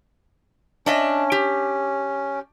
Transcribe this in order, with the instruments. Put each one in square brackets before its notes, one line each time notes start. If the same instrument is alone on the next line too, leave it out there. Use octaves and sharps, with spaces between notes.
[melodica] C#4 [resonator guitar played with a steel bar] D4 D#5 E5
[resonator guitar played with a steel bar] G4